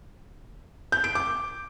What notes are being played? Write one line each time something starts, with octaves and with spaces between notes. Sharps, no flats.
G6
D7
D6